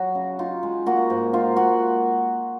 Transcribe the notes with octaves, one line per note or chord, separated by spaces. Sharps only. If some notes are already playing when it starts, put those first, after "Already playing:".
Already playing: F#3 F#4
C#3
D#4 F4
G#3
A#3 F#4
G#2
D#4 F4
A#3 F#4